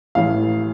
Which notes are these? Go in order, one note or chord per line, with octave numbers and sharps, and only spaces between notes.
A1 A2 E3 F5